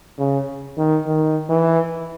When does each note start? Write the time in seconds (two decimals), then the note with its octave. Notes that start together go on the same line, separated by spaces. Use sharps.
0.19 C#3
0.77 D#3
1.06 D#3
1.49 E3